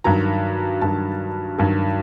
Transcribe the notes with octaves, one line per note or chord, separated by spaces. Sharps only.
G2 D#3 F#3 A#5
G2 D#3 F#3 A5
G2 D#3 F#3